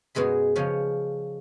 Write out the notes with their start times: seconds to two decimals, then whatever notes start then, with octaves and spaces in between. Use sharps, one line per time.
0.15 F#2 B2 G#3 G#4 B5
0.56 C#3 F3 C#4